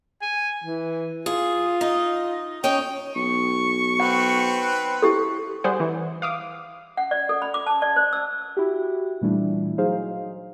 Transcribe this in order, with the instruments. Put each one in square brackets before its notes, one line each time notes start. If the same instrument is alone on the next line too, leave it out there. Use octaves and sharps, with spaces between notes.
[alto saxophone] G#5
E3
[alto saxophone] F4 [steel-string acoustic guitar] G#4
[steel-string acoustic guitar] D#4
[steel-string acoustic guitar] C#4 D#4 [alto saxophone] G5
[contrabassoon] B1 [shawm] C#6
[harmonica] C4 B4 [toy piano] F#5
[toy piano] E4 G4 A4
[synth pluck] G3 G#4 C5 F#5
E3
F5 D6 D#6
[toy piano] F#5
D5
A4
B5
D6
A5
D5
C5
E6
[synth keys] E4 F#4 G4
A#2 E3 G3 A3 D4 E4
F#3 D#4 G#4 C5 F5